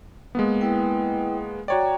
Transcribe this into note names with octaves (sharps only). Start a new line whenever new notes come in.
G#3 A#3 B3
E4 B4 G5
F#4 C#5 D5 G5 A#5